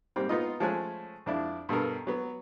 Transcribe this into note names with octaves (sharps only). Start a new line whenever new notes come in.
G#2 G3 A#3 C4
B3 D#4 F4 D#5
F3 G#3 A3 C#4 G#5 F#6
F2 D4 E4
G2 B2 A4 A#4
F#3 B3